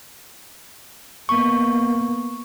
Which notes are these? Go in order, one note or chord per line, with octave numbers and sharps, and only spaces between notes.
A#3 B3 C#6